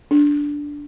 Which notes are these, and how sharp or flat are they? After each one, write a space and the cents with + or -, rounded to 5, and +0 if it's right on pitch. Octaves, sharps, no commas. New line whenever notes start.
D4 -10